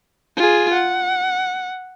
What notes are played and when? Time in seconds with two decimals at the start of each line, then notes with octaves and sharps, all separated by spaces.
0.36 F4 G#4
0.74 F#5